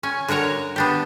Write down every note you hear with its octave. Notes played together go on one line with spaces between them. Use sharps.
C#4 G#5
D3 F#4 A#4 C#5 A#5
B3 D4 G4